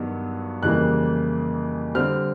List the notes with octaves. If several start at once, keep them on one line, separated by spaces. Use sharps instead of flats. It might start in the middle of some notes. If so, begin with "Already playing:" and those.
Already playing: G2 D#3 F#3 B3
F2 C#3 E3 G3 A#3 F#6
D3 G3 C4 F6